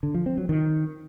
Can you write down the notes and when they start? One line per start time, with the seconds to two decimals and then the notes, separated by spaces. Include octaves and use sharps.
0.03 D3
0.15 F3
0.26 C4
0.38 F#3
0.49 D#3